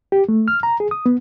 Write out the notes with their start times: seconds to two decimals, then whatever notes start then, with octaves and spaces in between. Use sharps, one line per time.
0.12 G4
0.29 A3
0.48 F6
0.63 A#5
0.80 G#4
0.91 D#6
1.06 B3